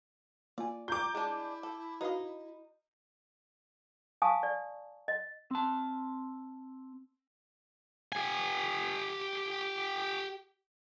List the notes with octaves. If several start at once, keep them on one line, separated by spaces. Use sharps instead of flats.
A#3 F4 D5 G#5
F4 A#5 D6 G6
G#3 D4 E4 G#4
A4
D#4 F#4 B4 D#5 F5
F5 G#5 A5 C#6 D#6
D5
D#5
C4 A5
G4 G#5